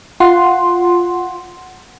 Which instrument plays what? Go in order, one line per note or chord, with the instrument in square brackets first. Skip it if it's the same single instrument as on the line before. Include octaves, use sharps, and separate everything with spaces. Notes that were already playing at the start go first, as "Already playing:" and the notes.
[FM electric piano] F4 F#5 C6